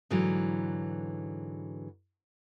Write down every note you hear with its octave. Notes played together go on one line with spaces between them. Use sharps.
G#2 D3 E3 F#3